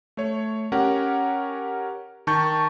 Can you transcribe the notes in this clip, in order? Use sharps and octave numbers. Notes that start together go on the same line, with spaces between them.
A3 C#5
C#4 G4 A#4 C#5 F#5
D#3 A5 C#6 G6